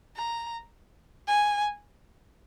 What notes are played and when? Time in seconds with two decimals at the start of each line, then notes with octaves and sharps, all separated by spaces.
0.16 A#5
1.28 G#5